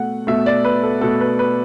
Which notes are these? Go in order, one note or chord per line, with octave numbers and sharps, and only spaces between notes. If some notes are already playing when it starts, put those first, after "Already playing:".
Already playing: B2 A3 F#5
B2 A3 E5
D5
B4
A4
B2 A3 A4
B4
B4